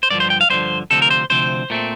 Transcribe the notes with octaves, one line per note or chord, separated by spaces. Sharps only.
C5
G2 D3 F3 D5
C5
G5
F5
G2 D3 F3 C5
D2 C3 F3 C4 A4
A#4
C5
D2 C3 F3 C4 C5
A#2 A3 C4